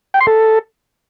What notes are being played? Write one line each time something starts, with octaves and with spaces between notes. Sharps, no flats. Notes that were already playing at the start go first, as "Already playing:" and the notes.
G5
C6
A4